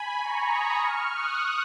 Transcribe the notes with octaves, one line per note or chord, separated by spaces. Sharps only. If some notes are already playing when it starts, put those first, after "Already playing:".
Already playing: G#5 B5
A#5 C#6
B5 D#6
C#6 F6
D#6 F#6